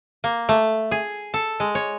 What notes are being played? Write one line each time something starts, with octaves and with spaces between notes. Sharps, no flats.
A#3
A3
G#4
A4
G#3
C#5